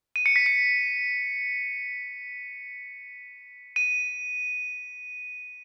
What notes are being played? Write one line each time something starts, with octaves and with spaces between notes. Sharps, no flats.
D#7
C#7
B6
C#7
D#7